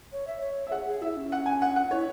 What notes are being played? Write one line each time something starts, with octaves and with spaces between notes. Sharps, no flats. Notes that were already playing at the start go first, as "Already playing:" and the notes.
C#5
E5
C#5
E5
G#4 F#5
G#4
E4 E5
C#4
F#5
G#5
F#5
F#5
E4 C#5